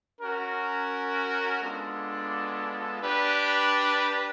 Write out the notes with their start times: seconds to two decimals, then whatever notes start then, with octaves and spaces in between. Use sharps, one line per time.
0.20 C#4 F#4 A#4
1.61 G#3 B3 D4 F4 A4
3.01 D4 G4 B4 D5